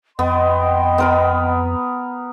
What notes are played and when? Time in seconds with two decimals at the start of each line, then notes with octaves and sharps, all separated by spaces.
0.19 F2 B3 D#5 G5 C6
0.98 B3 A#4 B5